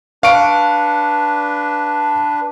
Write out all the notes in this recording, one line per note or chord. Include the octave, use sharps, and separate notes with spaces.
D4 B4 F5 C#6 D7